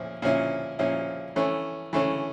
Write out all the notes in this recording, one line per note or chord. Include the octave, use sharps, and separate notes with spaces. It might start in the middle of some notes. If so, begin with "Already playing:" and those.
Already playing: A#2 F3 C#4 E4
A#2 F3 C#4 E4
A#2 F3 C#4 E4
E3 A3 C#4
E3 A3 C#4